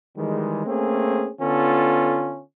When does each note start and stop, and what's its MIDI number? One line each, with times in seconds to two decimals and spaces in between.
0.17 0.63 51
0.17 0.63 52
0.17 0.63 55
0.17 0.63 56
0.66 1.30 57
0.66 1.30 58
0.66 1.30 60
0.66 1.30 61
0.66 1.30 68
1.41 2.41 50
1.41 2.41 59
1.41 2.41 61
1.41 2.41 65
1.41 2.41 69